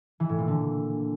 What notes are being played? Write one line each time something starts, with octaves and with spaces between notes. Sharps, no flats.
E3
A2
A#2
D3